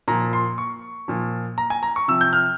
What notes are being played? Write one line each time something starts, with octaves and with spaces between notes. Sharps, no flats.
A#2 F3 A#5
C6
C#6
A#2 F3
A#5
G#5
A#5
C#6
C3 F3 E6
G6
F6